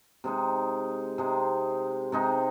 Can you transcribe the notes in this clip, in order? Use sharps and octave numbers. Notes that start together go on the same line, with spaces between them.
C3 G#3 D#4
C3 G#3 D#4
C3 G#3 D#4